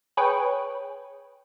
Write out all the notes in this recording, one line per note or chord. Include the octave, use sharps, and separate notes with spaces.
G#4 B4 C#5 G5